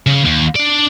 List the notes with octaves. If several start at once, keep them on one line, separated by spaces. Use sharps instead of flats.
C#3
D#2
D4 D5